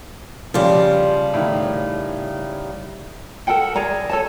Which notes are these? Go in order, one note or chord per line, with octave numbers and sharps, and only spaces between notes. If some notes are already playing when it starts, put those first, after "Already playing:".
C#3 F3 G3 G4
A2 D#3
A4 A#4 F#5 G5
G#4 D5 A#5
A4 C#5 A5